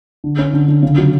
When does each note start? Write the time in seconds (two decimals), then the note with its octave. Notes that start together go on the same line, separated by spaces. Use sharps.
0.24 D3
0.38 C#4
0.53 D3
0.68 D3
0.83 C#3
0.98 F#3